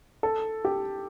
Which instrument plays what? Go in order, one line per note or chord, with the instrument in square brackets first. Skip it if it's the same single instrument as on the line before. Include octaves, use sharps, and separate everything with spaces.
[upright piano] A4
G4